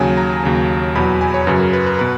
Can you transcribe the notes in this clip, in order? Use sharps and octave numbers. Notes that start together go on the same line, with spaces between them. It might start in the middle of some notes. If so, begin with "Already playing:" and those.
Already playing: D#2 C#3 F#3 G#5
A#5
D#2 C#3 F#3
E2 B2 F#3 B5
G#5
C#5
F#2 C#3 F#3 B4
A#4
B4
B4
B2 B4